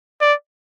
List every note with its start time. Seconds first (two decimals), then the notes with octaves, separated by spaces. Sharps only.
0.21 D5